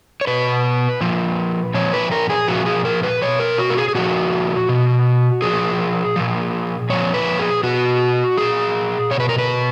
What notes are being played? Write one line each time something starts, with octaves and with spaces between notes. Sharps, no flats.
C#5
B2 B4
A#2 F3
A#2 F3 C#5
B4
A#4
G#4
A#2 F3 F#4
G#4
A#4
B4
B2 C#5
A#4
F#4
A#4
G#4
G#4
A#2 F3 F#4
B2
A#2 F3 G#4
A#2 F3
A#2 F3 C#5
B4
G#4
B2 F#4
A#2 F3 G#4
B2 C#5
B4
A#4
B4